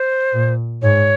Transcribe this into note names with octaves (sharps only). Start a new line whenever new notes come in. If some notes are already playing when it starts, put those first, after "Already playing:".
Already playing: C5
A#2
G#2 C#5